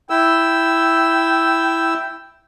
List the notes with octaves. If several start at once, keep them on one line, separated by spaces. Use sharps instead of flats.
E4 G5 E6